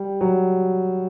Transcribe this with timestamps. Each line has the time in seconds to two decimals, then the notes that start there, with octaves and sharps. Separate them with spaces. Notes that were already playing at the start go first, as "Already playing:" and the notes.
Already playing: G3
0.21 F#3